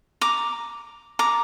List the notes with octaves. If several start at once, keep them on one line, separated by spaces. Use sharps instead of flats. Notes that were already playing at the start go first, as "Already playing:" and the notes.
A#5 D6
A#5 D6